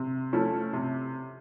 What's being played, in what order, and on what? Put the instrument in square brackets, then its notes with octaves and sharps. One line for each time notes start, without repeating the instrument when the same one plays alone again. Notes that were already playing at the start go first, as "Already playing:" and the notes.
Already playing: [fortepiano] C3
F3 A3 C#4 E4
C3